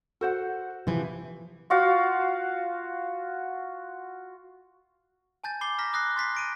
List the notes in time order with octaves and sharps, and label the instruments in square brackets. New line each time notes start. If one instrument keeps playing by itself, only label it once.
[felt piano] F#4 [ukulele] A4 C5 F#5
[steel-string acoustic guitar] C3 E3 [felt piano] F3
[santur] F4 F#4 F5
[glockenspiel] G#5 A5 G6 A6
B5 D6 C7 G7
A#5 F6 A#6 B6
B5 D#6 F#6 A#6 C7
C6 A6 B6 C7
A#6 D7 D#7